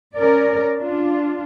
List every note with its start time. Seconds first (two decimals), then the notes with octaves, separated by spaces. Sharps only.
0.16 C#4 A#4 D5
0.79 D4 F4